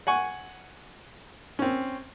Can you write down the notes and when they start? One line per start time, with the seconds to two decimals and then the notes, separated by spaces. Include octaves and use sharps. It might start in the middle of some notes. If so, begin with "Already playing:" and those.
0.07 F#5 G#5 C#6
1.59 C4 C#4